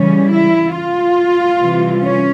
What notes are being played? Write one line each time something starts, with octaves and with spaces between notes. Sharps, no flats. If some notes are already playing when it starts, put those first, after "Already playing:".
Already playing: C#3 E3 G3 C#4
E4
F4
C3 E3 G3
C#4